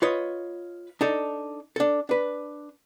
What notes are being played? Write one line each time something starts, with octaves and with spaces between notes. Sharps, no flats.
F4 B4 C#5 D#5
D4 D#4 A4
D4 A4
D4 B4